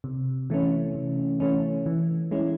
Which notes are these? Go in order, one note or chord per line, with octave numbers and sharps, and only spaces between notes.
C3
E3 A3 C#4
C3
E3 A3 C#4
E3
G#3 C#4 E4